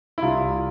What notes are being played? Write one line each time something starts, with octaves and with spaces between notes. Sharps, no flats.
E4
C2 F4